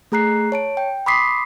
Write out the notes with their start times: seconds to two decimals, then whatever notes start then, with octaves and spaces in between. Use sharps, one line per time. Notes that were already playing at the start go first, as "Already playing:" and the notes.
0.12 A3 G#4 A#5 F#6 C7
0.52 C#5 A5 D7
0.77 G5
1.06 B5 C6 D6 D#6 B6 C7